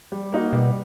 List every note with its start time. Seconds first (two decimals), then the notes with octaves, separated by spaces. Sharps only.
0.12 G3
0.32 A#3 D#4 F#4
0.53 B2 G3